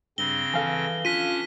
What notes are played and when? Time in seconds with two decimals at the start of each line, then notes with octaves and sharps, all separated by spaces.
0.18 G2 C#3 C4 A#6 G7
0.54 E3 A4 F5 G#5
1.05 C#4 D4 F4 B6 D#7